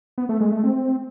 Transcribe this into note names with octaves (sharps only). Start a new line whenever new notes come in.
B3
A3
G#3
A3
C4